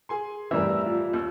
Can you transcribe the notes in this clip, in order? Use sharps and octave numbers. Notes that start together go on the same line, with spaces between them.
G#4 G#5 C6
F2 A2 E3 G3 A#4 E5 E6
F4
D#2 E6